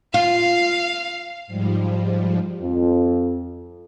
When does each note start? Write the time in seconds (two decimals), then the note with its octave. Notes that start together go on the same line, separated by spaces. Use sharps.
0.14 F4 F5
1.47 G#2 F3 G3
2.62 F2